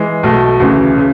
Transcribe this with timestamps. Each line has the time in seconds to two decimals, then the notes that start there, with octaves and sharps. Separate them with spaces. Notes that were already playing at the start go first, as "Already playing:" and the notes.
Already playing: E3 G#3
0.23 B1 B2 A3
0.60 D2 C#3 E3
0.98 C#3